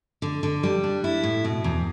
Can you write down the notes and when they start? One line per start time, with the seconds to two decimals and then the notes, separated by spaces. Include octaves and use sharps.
0.22 D3
0.43 D3
0.63 G3
0.84 D4
1.04 E4
1.23 A2
1.44 B2
1.64 E2